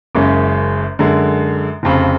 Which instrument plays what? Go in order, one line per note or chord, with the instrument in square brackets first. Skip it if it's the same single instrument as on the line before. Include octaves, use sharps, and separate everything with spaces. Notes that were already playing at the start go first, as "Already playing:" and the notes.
[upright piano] F#1 F#2 C#3 G#3 C#4
F#2 D3 G#3
F1 F2 C#3